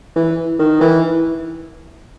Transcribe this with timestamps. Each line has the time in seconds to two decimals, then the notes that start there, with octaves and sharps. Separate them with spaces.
0.16 E3
0.59 D#3
0.81 E3